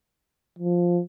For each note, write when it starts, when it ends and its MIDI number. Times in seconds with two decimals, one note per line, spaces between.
0.59 1.01 53